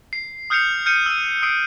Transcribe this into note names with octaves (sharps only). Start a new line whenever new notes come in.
C7
D#6 F6 G6 C7 C#7 F7
F6 G6 C#7 D#7
E6 D#7
D#6 E6 C7 D7